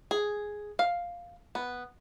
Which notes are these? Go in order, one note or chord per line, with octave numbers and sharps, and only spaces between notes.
G#4
F5
B3